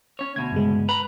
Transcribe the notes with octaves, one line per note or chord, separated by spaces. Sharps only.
C#4 C#5
D2 B2 G#6
G2 C#3 G#3
B4 A#5 B5